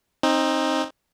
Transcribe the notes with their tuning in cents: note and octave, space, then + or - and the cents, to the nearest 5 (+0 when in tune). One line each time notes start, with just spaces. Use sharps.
C4 +25 D#4 +0